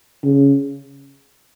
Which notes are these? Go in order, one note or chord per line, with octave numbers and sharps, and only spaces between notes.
C#3